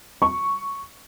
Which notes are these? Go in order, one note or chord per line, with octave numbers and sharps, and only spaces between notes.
C#6